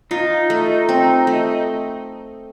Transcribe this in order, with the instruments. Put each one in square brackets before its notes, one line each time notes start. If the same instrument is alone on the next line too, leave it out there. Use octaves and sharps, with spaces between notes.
[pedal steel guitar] D#4 [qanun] F4
[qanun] A3
C4
A3